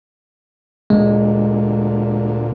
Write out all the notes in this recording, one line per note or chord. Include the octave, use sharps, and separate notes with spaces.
D2 A#2 G#3